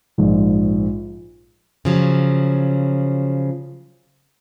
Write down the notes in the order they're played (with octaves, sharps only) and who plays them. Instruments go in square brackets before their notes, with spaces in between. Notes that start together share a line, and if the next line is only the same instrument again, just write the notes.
[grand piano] A#1 G#2
[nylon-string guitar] C#3 F3 F#3